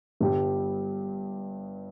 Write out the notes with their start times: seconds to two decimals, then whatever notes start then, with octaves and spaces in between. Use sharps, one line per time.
0.20 G1 G2 G3